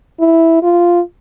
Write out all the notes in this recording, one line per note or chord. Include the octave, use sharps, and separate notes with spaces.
E4
F4